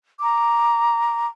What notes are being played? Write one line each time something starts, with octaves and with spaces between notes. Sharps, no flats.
A#5 D6